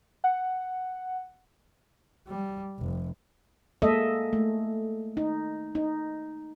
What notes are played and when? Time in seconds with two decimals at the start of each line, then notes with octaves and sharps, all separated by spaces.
0.24 F#5
2.27 G3
2.79 F1
3.82 G#3 A#3 A4 D#5 E5
4.33 A3
5.17 D#4
5.75 D#4